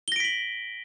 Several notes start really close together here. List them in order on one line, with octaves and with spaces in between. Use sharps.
G7 A#6 D7 B6 F#7